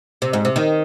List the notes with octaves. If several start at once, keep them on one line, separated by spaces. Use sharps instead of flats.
C3
G#2
C3
D#3